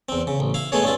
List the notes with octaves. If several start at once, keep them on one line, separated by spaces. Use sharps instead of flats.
E2 C4
C#3
A1
E4 F5
G#3 A3 B3 G#4 C#5
G2 C#4 E4 F4